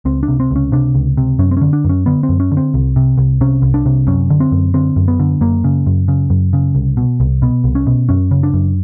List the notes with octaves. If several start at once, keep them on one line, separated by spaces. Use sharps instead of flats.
C#2 C4
D4
C3
C4
C#2 C#4
C3 D4
C#2
C3
F#2 C#4
C4
D3 C#4
D4
F#2 C#4
D3 B3
C4
F#2
C#4
D3
C4
C2
C3
C2
C3 C#4
C2
D4
C3
F#2 C#4
D3
C4
F#2
D3 C4
F#2
B3
D3
F#2 A#3
C#3
F#2
C#3
F#2
C#3
C2
B2
C2
B2 B3
C2
C#4
B2
F#2 C#4
C#3
D4
F#2